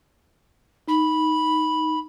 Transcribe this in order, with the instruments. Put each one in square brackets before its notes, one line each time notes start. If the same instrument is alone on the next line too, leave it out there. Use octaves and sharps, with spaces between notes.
[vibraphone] D#4 [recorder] B5